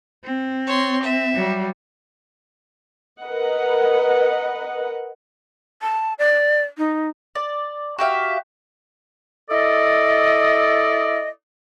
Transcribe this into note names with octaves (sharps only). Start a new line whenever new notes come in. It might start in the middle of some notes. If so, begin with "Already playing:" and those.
C4
C#5 C6
E5
F#3 G3
A#4 B4 D#5 F#5
A5
D5
D#4
D5
F#4 G4 E5 F5
E4 A4 D5 D#5